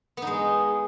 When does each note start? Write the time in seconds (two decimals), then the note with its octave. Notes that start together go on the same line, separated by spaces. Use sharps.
0.17 B3
0.22 D#4
0.27 G#3